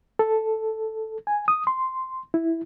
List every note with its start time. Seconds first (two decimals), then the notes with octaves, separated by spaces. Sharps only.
0.19 A4
1.27 G#5
1.48 D#6
1.67 C6
2.34 E4